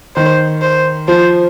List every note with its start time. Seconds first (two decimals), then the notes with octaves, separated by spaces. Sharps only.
0.16 D#3 C5
0.62 C5
1.08 F3 C5